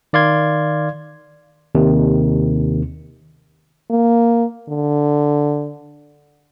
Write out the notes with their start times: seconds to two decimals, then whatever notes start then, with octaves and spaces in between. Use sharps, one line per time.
0.13 D#3 D5 F5 C6 G#6
1.75 D#2 C3 D#3
3.90 A#3
4.69 D3